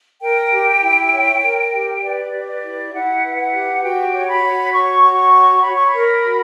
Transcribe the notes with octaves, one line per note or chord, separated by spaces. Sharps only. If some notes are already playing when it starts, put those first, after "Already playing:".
A#4 G5
G4
E4
C#5
A#4
G4
B4 D5
G4
D5
E4
E4 F#5
B4
F#5
G4
F#4 G5
C#5
B5
F#4
C#5 C#6
F#4
C#6
C#5
C#5 B5
C#6
B5
A#4
F#4